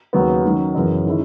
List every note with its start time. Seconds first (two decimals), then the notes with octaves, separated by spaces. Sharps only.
0.13 D#2 C#3 F#3 B3
0.44 D#3 F#3 C#4
0.75 F#2 C#3 E3 B3
1.06 D#3 G#3 C#4 E4